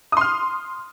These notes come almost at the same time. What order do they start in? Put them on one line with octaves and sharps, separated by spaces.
D#6 C6 F6